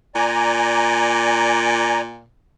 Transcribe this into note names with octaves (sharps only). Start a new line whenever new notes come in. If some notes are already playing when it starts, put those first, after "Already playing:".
A#2 D5 G#5 A#5